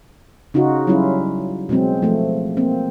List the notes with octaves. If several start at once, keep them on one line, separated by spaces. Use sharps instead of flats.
C#3 D#4 F4 F#4
F#3 G3 C#4 E4 F4
B2 F#3 G#3 C4
F3 A3
A#3 C4